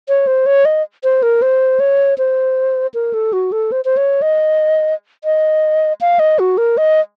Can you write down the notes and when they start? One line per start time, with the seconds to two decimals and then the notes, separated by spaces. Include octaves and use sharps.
0.08 C#5
0.27 C5
0.46 C#5
0.65 D#5
1.04 C5
1.23 A#4
1.42 C5
1.80 C#5
2.18 C5
2.94 A#4
3.14 A4
3.33 F#4
3.52 A4
3.72 C5
3.85 C5
3.97 C#5
4.22 D#5
5.24 D#5
6.01 F5
6.19 D#5
6.39 F#4
6.58 A#4
6.78 D#5